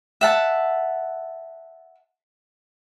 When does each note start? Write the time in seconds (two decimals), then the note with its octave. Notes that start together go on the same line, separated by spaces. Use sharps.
0.21 E5 F#5 A5